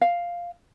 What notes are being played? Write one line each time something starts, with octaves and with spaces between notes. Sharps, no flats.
F5